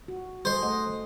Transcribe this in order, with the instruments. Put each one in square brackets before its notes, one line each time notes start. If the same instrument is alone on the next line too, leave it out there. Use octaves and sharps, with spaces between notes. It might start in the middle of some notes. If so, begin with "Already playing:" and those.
[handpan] F#4
[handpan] G#4 A4 D#5 [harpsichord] C5
[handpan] A3 D#5 F#5